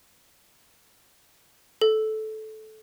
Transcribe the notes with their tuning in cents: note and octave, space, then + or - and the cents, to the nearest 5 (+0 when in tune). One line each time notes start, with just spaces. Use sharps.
A4 -15